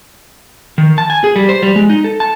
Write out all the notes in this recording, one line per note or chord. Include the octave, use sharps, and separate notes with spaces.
D#3
A5
G#5
G#4
G3
C5
G3
G#3
D#4
A4
A5